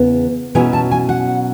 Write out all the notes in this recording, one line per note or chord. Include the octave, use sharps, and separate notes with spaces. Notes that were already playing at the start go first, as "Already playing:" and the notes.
Already playing: E2 C#3 E3 B3
B2 F#3 C#4 E4 G#5
A5
G#5
F#5